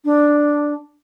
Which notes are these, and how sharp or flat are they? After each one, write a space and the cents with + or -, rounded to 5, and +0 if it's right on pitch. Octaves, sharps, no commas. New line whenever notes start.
D4 +0